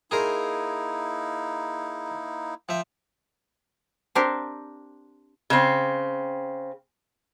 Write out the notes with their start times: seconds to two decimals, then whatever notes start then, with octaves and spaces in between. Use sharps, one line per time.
0.11 A#3 D#4 E4 G#4 A#4 C5
2.69 F3 E5 G5
4.15 C4 D4 G4 A#4 C5
5.50 C#3 C4